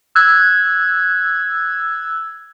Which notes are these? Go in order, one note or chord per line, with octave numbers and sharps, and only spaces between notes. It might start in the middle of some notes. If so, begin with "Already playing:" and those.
E6 F#6 G#6